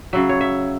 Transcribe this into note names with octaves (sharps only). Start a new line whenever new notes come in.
C#3 F#3 E5
C#5
E5